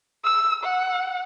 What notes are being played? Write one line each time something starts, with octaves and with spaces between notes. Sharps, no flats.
E6
F#5